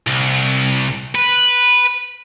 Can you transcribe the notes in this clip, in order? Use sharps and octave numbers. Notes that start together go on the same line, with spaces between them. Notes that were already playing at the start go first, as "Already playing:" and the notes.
C2
B4